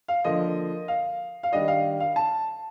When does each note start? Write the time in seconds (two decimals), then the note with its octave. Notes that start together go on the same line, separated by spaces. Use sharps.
0.08 F5
0.25 D3 F3 A#3 D#5
0.88 F5
1.43 F5
1.52 D#3 G3 D4 D#5
1.68 F5
2.00 F5
2.16 A5